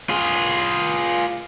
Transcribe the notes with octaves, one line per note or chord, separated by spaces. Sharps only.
F4 G#4